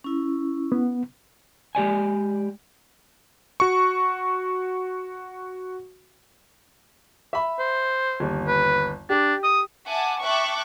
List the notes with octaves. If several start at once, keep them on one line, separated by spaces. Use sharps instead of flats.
C#4 E4
B3
G#3 G4 D5 G#5
F#4 C#6
E5 B5
C5
G1 D#2
B4
D4 G4
D#6
E5 F#5 G#5 A5 D6
E5 G5 A5 C#6 D6 F#6